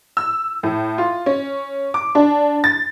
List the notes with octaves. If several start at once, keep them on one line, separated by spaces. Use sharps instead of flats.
E6
A2
F4
C#4
D6
D4
A6